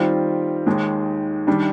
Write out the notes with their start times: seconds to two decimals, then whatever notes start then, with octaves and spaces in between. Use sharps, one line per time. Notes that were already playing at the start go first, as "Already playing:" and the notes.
Already playing: D#3 G3 C4 F4
0.66 D#2 D#3 G#3
1.47 D#3 G3 D4